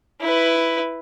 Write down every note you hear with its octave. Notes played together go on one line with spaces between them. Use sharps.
E4 B4